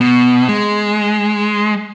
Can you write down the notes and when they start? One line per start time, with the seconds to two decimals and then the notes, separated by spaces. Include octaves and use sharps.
0.01 B2
0.49 G#3